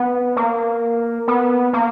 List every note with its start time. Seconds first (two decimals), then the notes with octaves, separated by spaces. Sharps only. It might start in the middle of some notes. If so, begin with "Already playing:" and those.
Already playing: B3
0.36 A#3
1.28 B3
1.73 A#3